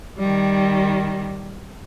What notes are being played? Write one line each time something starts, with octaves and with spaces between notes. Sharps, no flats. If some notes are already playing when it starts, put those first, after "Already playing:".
D#3 G3